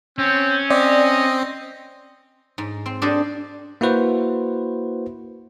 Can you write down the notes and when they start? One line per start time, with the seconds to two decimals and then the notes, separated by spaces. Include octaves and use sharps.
0.18 C4 C#4
0.70 C4 D5 D#5
2.58 G#2
2.86 C4
3.02 D4 G4 A4 C5 D#5
3.81 A#3 E4 F#4 B4 C5